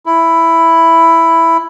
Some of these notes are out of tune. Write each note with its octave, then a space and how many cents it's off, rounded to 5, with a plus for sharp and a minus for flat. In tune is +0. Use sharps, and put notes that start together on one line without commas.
E4 +5